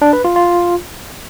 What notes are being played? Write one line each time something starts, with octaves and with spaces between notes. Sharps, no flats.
D4
B4
F4
F4